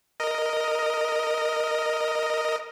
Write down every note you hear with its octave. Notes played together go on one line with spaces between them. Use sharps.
A#4 D#5